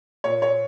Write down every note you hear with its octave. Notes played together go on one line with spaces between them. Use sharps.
A#2 C#5
C#5